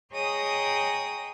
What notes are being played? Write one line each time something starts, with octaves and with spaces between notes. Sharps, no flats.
G#4 C#5 D#5 G5 A#5 D#6